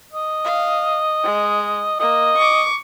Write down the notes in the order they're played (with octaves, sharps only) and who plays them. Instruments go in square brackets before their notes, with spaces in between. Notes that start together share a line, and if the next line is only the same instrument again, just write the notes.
[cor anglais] D#5
[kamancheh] F5
G#3
[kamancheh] A#3 [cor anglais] D#5
[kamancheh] C#6 D6